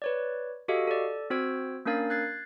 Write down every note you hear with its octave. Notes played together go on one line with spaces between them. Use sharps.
B4 C#5 D5
F#4 G4 A4 D#5 F5
A4 D5
C4 F#4 C5 E6 G#6 D7
A#3 C#4 D4 A#4 F5 A6
F#6 G#6 A6 C7